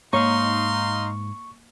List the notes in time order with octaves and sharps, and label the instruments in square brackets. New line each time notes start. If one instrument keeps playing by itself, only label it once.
[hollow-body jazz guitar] G#2 C#5 [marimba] A#3 [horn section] D#4 F5 C6 [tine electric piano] C#6